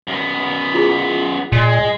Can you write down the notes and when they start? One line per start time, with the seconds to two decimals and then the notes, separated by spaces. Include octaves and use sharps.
0.07 F#2 B3
0.74 E4 F4 G#4
1.52 A#2 G#3